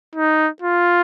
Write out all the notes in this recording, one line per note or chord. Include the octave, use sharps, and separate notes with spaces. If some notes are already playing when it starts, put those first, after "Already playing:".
D#4
F4